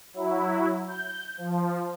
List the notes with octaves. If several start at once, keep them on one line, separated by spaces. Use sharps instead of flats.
F#3 E4
G6
F3